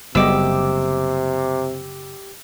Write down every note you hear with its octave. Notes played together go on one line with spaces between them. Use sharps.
F#1 C3 G3 B3 G4 D#5 D6 E6